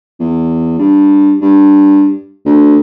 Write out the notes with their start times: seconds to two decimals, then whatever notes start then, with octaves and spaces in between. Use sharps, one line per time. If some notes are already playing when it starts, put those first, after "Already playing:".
0.20 E2
0.79 G2
1.42 G2
2.45 D2